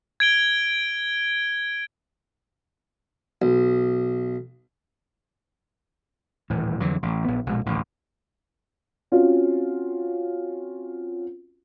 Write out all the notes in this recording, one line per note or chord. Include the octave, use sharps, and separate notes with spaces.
G#6 D7 G7
B1
D#1 A2 E3
F2 D3 E3 F#3
A1
A#1 B3
A#1 B2 G#3
D1 A1 D#2
C4 C#4 F4 F#4